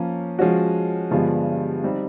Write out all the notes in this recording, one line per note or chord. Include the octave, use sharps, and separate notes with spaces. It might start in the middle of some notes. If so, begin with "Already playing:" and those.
Already playing: F3 A#3 C#4
F3 G#3 C#4 F#4
G2 D3 F3 G#3 B3
G3 C4 D#4 G4